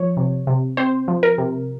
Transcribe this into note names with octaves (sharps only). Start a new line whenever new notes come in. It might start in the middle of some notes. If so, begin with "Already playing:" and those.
Already playing: F3 C#5
C3
C3
C4 C5
F3
A#4
C3